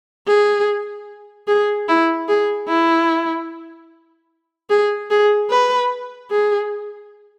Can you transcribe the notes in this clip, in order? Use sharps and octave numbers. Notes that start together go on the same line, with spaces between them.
G#4
G#4
E4
G#4
E4
G#4
G#4
B4
G#4